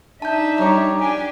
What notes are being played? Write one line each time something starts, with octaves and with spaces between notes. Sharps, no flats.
D4 D#4 E5 A5 G6
G3 C#5 A#5 D6
D4 G4 G#5